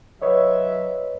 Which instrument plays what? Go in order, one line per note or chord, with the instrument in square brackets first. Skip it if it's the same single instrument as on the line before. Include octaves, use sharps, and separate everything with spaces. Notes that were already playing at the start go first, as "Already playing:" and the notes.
[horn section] F#3 E5 [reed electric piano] B4 C#5 D#5